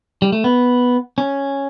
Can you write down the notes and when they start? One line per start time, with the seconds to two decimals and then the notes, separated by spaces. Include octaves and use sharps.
0.22 G3
0.32 A3
0.44 B3
1.18 C#4